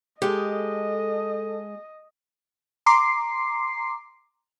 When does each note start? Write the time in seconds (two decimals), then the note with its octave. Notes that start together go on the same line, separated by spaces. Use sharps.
0.22 G#3 G4 A4 D#5
2.86 A#5 C6 D6 C7